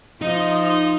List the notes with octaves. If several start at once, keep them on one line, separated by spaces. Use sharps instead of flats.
F3 D#4